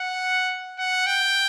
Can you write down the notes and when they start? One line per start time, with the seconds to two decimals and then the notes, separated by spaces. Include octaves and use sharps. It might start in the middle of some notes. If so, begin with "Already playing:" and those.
Already playing: F#5
0.78 F#5
1.06 G5